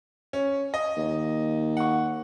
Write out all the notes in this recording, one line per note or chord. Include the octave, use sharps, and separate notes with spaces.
C#4
D#5
D#2
F#5 C#6